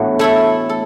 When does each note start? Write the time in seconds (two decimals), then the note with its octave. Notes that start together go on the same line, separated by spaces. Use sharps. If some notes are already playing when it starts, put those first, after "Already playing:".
Already playing: A2 E3 B3 D4 F#4
0.19 A3 E4 A4
0.69 A4